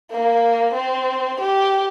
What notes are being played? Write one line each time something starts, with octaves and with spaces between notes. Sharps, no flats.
A#3
C4
G4